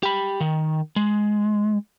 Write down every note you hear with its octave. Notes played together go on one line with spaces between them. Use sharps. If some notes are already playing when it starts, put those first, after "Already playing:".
G4 B5
D#3
G#3